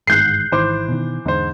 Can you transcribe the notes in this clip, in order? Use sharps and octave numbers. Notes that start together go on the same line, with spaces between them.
G1 G#2 D#3 F#6 G6 C7
G#1 D#3 E3 C5 D6
B2 D#3
E2 G#2 D3 C5